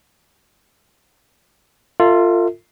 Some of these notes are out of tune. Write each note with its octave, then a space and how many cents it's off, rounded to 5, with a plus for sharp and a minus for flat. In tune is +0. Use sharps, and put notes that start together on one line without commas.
F4 +0 A4 +45 E5 -20